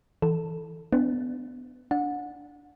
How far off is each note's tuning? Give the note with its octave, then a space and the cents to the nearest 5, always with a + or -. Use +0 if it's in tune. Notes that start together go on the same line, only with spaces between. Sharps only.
E3 -10 A4 +0
B3 +25 D4 +0
D4 -5 F#5 -30